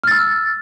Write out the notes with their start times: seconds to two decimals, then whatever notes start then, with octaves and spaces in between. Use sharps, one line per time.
0.04 F6
0.07 A6
0.11 E6